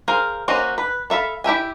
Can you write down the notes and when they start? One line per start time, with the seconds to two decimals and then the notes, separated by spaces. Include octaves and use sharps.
0.08 G#4 A#4 C5 F5
0.48 A#3 C#4 F#4 C5 D#5
0.78 B4
1.10 A4 E5 F5 B5
1.44 E4 G4 E5 G#5